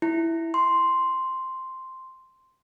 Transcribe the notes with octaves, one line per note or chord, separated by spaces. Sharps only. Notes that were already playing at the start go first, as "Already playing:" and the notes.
E4
C6